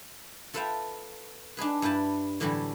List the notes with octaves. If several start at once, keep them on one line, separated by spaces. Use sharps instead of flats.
F4 A4 B4 E5 F5 G5
D4 D#4 G#4 B4
G2 E4 B4 G5 A5
A2 D3 E3 F#3 G3 A3